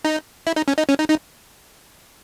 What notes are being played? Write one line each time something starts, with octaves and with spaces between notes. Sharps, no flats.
D#4
E4
D#4
C#4
D#4
C#4
D#4
D#4